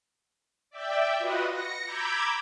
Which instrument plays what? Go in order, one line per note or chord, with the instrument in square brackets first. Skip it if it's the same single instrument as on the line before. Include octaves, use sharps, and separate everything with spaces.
[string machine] D5 E5 G5
F4 F#4 B4 D#5 F#5 B5
A#6 C#7
A#5 B5 D6 E6 G6 G#6